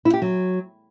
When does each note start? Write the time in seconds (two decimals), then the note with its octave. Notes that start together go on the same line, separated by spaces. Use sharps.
0.05 E4
0.14 G4
0.22 F#3